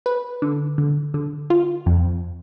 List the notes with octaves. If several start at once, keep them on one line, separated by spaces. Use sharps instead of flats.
B4
D3
D3
D3
F4
F2